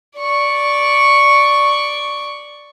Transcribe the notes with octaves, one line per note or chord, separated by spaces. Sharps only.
D5 C#6